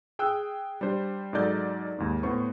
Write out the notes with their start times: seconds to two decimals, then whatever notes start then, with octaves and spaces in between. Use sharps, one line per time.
0.19 G#4 G5 D#6 E6 F#6
0.81 G3 D4 C5
1.33 G#2 F#3 D#4 A4 D5 G6
1.99 D#2 G#2
2.23 A2 B3 C5 C#6